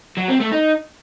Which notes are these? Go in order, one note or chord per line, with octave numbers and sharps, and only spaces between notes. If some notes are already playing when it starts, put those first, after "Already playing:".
F#3
C4
A3
D#4